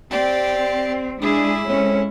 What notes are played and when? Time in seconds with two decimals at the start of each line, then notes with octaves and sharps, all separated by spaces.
0.11 C4 G4 D5
1.21 G#3 D4 E4 G#4 D5
1.66 G#3 C4 C#4 A4 C#5